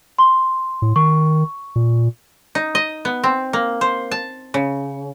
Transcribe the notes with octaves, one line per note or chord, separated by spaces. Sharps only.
C6
A2
D#3 C#6
A#2
D#4
D#5
B3
C4
A#3
C5
A5
C#3